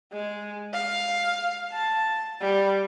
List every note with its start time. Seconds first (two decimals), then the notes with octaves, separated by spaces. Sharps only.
0.12 G#3
0.73 F5
1.72 A5
2.41 G3